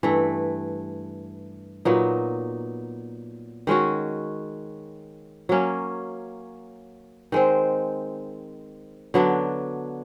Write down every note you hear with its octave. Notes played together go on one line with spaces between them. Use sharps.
G2 E3 A3
A#2 F#3 B3 D#4
D#3 G#3 C#4 F#4
F#3 A#3 C#4
D#3 G#3 C4
D3 F#3 B3 D4